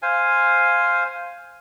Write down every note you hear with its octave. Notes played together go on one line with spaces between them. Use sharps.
C5 F5 G#5